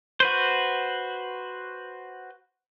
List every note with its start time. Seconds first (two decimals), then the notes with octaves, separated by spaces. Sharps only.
0.20 F#4 B4 C5